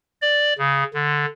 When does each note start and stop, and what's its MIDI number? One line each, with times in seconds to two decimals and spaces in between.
0.22 0.53 74
0.58 0.84 49
0.94 1.26 50